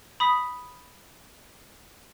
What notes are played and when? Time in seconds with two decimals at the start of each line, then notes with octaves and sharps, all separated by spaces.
0.20 B5 D#6 B6